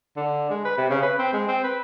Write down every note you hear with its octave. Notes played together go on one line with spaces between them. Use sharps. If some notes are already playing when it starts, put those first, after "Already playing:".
D3
G#3
B4
C3
C#3
B4
C4
G#3
C4
B4